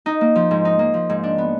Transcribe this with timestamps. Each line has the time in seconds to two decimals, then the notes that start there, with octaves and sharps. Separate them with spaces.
0.06 D#4
0.21 A#3
0.36 F3
0.51 G#2
0.65 D#4
0.79 A#3
0.94 F3
1.10 G#2
1.23 D4
1.38 B3